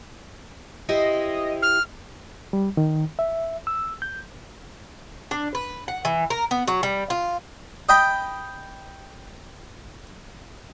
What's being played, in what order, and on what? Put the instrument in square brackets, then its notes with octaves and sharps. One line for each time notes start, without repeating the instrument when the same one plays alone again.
[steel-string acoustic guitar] E4 G4 C5 [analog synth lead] D#5
[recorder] F6
[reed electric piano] G3
D#3
E5
E6
G6
[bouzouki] D4
B4
F#5
E3
A#4
B3
F#3
G3
F4
[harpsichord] D#5 G5 B5